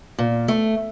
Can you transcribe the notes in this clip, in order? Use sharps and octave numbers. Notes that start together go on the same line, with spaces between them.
A#2
A3